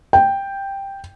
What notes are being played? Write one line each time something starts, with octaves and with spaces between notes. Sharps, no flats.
G5